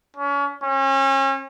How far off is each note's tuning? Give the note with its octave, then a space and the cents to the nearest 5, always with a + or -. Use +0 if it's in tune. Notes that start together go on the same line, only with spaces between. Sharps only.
C#4 +35
C#4 -35